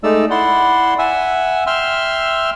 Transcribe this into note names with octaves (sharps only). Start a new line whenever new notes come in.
G#3 A3 D#4 D5 E6
E4 D5 F#5 C6
E5 F#5 G#5 E6
E5 G5 C6 E6 F6